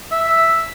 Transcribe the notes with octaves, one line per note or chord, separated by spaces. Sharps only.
E5